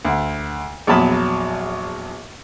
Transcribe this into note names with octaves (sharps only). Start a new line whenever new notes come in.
D2
A#1 E2 F#3 A5 B5 D#6